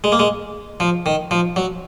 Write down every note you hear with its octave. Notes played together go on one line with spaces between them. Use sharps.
G#3
A#3
G#3
F3
D#3
F3
F#3